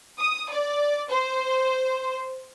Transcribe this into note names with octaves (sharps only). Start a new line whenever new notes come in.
D#6
D5
C5